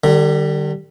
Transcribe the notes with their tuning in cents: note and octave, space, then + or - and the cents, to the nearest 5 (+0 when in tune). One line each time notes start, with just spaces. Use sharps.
D3 +45 G3 +0